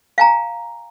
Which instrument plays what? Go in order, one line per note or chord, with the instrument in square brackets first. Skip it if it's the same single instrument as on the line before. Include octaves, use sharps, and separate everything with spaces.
[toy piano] F5 G#5 A#5